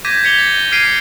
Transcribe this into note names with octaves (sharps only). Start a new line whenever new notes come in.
D6 G6 G#6 A#6 B6 D#7
G#6 B6 C#7 F7 G7
A6
F6 G#6 B6 C7 D7 D#7